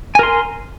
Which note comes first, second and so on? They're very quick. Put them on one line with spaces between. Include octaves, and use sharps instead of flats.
G#5 A#4 C6